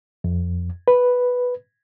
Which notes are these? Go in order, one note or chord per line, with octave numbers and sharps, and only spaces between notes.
F2
B4